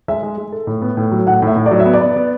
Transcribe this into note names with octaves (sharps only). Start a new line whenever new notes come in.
G#3 E5
G#3
G#3
A4
A2
B3
A2
F#3
A2 F#5
A2
E5
A2
D5
F#3
E5
B3
D5
B3
B3